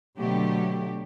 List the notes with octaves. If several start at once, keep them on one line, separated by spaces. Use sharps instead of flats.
B2 D3 F#3 A3 G4